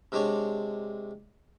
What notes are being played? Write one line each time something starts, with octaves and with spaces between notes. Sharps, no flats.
C3 G#3 D4 C#5 C#6